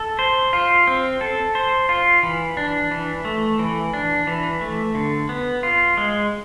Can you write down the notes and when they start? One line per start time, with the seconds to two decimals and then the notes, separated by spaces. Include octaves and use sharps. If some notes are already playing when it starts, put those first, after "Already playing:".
Already playing: A4
0.19 C5
0.53 F4
0.87 C4
1.21 A4
1.55 C5
1.89 F4
2.23 E3
2.57 D4
2.91 E3
3.25 A3
3.59 E3
3.93 D4
4.27 E3
4.61 A3
4.95 D3
5.29 B3
5.63 F4
5.97 G#3